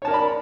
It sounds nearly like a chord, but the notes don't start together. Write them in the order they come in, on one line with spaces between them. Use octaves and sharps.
C#5 A5 A#4 D5 B5